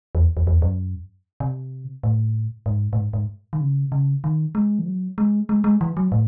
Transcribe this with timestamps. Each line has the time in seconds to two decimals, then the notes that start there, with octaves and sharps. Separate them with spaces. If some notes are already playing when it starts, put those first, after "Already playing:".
0.15 E2
0.37 E2
0.47 E2
0.62 F#2
1.40 C3
2.03 A2
2.66 G#2
2.93 A2
2.98 G#2
3.13 G#2
3.53 D#3
3.60 C#3
3.85 C3
3.92 C#3
4.24 D#3
4.55 G#3
4.79 E3
4.86 F#3
5.18 G#3
5.49 G#3
5.64 G#3
5.81 E3
5.97 F#3
6.12 A2